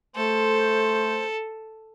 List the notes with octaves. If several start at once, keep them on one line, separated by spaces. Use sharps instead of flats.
A3 A4 C5